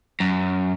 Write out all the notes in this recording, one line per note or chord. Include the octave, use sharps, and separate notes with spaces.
F#2